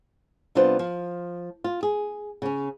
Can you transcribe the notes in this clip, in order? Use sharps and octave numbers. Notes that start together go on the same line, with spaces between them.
C3 G3 B3 D4 F4 C5
F3
F4
G#4
C#3 C#4